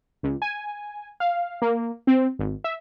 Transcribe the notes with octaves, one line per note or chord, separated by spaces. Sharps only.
C#2
G#5
F5
A#3
C4
G#1
E5